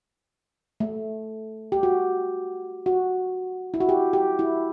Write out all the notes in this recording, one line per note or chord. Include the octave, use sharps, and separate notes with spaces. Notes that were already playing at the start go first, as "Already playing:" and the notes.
A3
G4
F#4
F#4
E4
F#4
G4
G4
E4